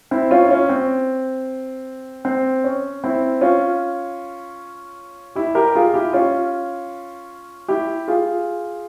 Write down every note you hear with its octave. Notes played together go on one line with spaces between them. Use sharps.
C4 E4
C#4 F4
E4
C#4
C4
C4
C#4
C4 E4
C#4 F4
E4 G4
G4 A#4
F4 G#4
E4 G4
C#4 F4
E4 G4
F4 G#4